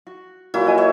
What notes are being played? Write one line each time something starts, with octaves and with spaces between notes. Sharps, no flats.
F#4
A#2 F#3 E4
A#4 D#5 G#5
C#5